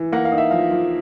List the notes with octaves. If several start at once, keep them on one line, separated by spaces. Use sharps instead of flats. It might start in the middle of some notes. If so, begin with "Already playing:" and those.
Already playing: E3
A#3 F#5
F5
D#4
E5
F3 F5
F3